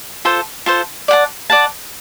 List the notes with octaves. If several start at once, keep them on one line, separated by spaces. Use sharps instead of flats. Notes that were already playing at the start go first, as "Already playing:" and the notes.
F4 A4 C5
F4 A4 C5
D5 F#5 A5
D5 F#5 A5